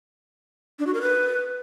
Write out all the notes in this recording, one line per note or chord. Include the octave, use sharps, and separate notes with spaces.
D4
F#4
A#4
B4